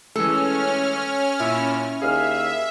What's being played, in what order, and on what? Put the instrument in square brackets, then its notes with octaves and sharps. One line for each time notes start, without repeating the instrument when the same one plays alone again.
[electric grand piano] E3 G#3 A3 [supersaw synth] C#4 F6 [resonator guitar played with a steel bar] A4
[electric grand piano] A#2 [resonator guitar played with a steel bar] E4
[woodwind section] D#2 F5 F6 [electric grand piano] G#4 [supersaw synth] E5